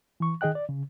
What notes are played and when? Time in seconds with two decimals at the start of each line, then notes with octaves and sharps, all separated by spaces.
0.20 E3 C#6
0.41 D#3 G#4 D#5 G5 F#6
0.55 D5
0.69 C#3